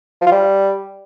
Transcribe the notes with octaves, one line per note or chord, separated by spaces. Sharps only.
F3
F4
G3